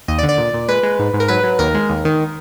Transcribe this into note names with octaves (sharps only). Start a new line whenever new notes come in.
D#2 D#5
D5
D3
D5
A#2
A#2
G#3 B4
G#3
G#2
G#2
A#4
F#3 B4
F#3
D#2 A#4
G#3
D#2
D#3